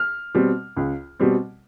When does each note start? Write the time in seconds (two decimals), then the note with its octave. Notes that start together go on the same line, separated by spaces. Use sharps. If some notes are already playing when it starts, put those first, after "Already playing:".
Already playing: F6
0.35 B2 G3 C4
0.77 C#2
1.20 B2 G3 C4